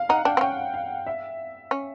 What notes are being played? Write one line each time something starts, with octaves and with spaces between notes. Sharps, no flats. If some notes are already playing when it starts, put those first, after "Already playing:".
Already playing: F5
D#4 F#5
D4 G5
C4
C#4 G5
F5
E5
C#4